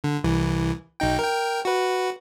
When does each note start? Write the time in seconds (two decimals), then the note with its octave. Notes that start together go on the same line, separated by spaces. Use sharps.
0.04 D3
0.24 C2 E3
1.00 B1 D#4 G5
1.19 A#4 G5
1.65 F#4 B4